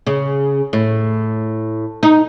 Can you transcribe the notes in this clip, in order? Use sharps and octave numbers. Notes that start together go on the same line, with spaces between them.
C#3
A2
D#4